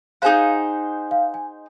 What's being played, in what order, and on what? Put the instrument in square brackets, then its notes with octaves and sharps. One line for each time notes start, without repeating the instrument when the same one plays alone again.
[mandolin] D#4 G#4 C5 F#5 [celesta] F5
[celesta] F5
G#5